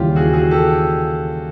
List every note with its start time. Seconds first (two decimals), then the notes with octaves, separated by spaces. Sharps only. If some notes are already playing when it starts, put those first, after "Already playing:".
Already playing: D#2 C#3 E3 G3 F4 G4
0.16 F#4 G#4
0.33 F#4 G#4
0.51 G4 A4